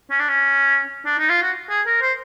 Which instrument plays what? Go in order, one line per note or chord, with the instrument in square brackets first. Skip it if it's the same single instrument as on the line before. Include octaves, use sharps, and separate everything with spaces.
[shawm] C#4
D4
C#4
D4
D#4
F4
F#4
G#4
A#4
C5